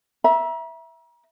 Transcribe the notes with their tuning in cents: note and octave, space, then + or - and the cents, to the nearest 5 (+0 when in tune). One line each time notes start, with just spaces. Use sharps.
E5 +0 A#5 +40